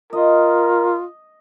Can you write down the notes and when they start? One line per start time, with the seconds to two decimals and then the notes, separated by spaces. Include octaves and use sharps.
0.13 F4 A#4 D#5